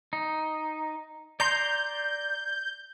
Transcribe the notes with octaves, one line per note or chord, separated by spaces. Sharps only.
D#4
D5 A#5 C6 G6